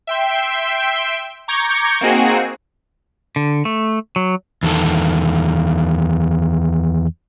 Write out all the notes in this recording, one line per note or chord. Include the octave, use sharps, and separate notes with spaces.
E5 G5 C6
A#5 C#6 D6 G6 G#6 C#7
A#3 C4 D#4 F#4 G#4
D3
A3
F#3
E2 D#3 A4